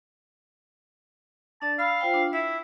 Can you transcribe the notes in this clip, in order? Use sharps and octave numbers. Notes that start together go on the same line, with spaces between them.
D4 D5 A5
F5 B5 E6
F4 C5 G5
D4
E4 E5